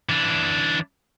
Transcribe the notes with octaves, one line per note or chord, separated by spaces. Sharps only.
E3 D4